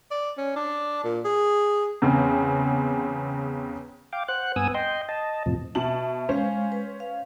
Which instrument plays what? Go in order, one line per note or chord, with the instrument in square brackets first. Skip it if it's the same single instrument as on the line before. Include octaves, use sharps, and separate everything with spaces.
[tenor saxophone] D5
C#4
D4
A#2
G#4
[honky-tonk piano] E2 C#3 C4
[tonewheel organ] F5 G5 D6
C5 F#5 F#6
G2 B3 G#5 D#6 E6
D#5 G5 C6
D#5 A5
F2 A2 C3 F3
[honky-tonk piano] B2 A5 F#7 [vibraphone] E5
[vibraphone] G#3 F5 [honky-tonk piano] C#4 C5
[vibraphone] B4
F5